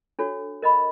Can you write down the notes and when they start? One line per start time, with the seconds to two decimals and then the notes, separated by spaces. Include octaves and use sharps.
0.19 D4 F#4 A4 C#5
0.62 A#4 D#5 F#5 B5